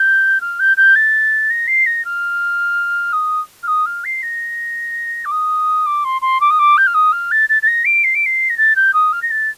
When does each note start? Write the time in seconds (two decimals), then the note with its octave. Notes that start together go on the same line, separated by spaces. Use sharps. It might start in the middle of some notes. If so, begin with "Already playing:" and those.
Already playing: G6
0.41 F6
0.59 G6
0.77 G6
0.95 A6
1.50 A#6
1.67 C7
1.86 A#6
2.04 F6
3.13 D#6
3.63 F6
3.67 D#6
3.86 F6
4.04 C7
4.22 A#6
5.25 D6
5.31 D#6
5.86 D6
6.04 C6
6.21 C6
6.40 D6
6.50 D#6
6.59 D6
6.77 G6
6.87 F6
6.94 D#6
7.12 F6
7.31 A6
7.49 A6
7.62 A6
7.67 A#6
7.85 D7
8.04 C7
8.14 D7
8.26 C7
8.49 A#6
8.57 A6
8.76 G6
8.93 D#6
9.12 F6
9.22 A#6
9.30 A6